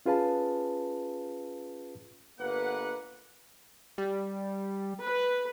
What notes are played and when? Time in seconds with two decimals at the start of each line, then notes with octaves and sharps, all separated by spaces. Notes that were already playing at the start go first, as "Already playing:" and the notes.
0.06 C#4 F4 G#4 B4 F5 A5
2.39 G1 A#3 B4 F#5
3.98 G3
5.02 B4